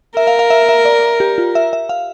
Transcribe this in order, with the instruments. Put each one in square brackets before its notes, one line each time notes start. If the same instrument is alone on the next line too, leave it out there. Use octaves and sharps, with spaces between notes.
[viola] A#4 [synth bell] E5
[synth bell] F5
F5
E5
E5
D5
G4
F4
E5
E5
F5